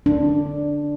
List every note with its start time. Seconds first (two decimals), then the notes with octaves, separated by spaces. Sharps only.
0.06 D4